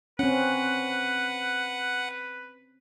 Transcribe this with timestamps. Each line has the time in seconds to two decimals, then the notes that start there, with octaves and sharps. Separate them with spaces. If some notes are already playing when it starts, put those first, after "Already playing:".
0.19 C4 C#4 B4 F#5